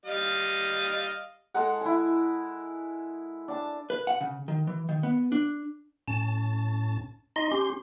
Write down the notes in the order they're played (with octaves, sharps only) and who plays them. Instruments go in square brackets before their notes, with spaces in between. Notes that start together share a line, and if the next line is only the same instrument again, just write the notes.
[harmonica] G3 D#5 F5
[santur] G#3 A4 A#4 F#5
E4 G#5
D4 A5
[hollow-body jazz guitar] B4
F#5
C#3
D#3
E3
D#3
B3
D4
[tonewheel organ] A2 C#4 A5
D#4 D#5 C6
C#4 G4 C6